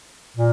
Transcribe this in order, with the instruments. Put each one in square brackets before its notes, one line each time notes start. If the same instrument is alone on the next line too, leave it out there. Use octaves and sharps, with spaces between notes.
[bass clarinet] A#2